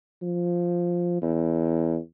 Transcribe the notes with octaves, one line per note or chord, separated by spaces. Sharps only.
F3
E2